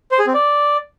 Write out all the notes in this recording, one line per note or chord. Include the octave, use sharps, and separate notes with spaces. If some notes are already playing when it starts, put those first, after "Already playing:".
C5
G#4
C4
D5